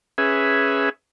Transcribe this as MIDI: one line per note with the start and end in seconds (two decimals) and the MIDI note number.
0.18 0.89 61
0.18 0.89 68
0.18 0.89 71
0.18 0.89 76